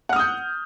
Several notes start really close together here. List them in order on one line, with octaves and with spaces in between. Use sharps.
F#5 F6 D#6 G6